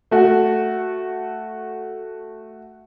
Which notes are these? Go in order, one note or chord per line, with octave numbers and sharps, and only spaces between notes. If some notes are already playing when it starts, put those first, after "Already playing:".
A3 F#4